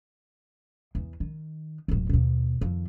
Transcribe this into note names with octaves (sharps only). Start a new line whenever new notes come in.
E2
D#3
D1 D#2
D#2 B2
F2 D#3